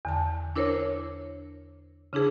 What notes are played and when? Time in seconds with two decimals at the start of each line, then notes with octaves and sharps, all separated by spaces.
0.05 E2 D3 A5
0.56 D4 E4 A#4 C5 C#5
2.13 C#3 D4 E4 G#4 C5